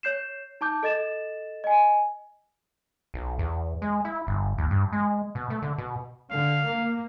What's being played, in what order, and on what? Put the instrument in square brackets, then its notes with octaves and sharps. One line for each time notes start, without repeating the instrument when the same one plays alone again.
[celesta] C#5 G6 C7 E7
D#4 A5 D6 G6
A4 D#5 A6 E7
D#5 G#5
[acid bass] B1
E2
G#3
E4
G1
D#2
G2
G#3
B2
A3
D3
B2
[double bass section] D3 [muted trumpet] F5
[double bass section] A#3